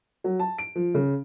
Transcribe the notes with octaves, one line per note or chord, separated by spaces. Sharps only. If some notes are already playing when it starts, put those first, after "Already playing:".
F#3
A5
D7
F3
C#3